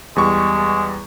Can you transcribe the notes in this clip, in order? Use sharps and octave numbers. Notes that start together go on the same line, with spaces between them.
E2 G3 G#3 C#6